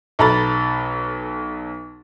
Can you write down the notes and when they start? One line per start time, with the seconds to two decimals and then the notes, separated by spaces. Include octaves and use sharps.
0.19 B1 A4 A#5 B5 A6